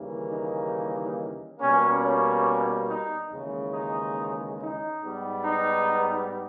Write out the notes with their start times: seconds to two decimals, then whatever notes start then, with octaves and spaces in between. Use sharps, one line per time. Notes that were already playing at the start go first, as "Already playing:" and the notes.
Already playing: D#2 C#3 E3 G3 A#3
0.32 D#4
1.60 B2 G3 A#3 C#4
2.02 C#4
2.88 D#4
3.31 D#2 C#3 E3 G#3
3.73 D#4
4.59 D#4
5.02 G#2 G3 B3
5.44 D#4